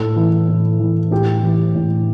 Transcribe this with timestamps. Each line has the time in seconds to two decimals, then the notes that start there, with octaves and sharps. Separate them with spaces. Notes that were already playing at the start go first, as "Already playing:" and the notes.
Already playing: A2 A4
0.16 E3
0.48 A2
0.80 E3
1.11 A2 G4
1.43 E3
1.75 A2